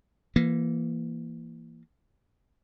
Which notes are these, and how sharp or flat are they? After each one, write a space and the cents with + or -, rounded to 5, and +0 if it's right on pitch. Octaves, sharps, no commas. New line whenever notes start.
E3 +20 A#3 +0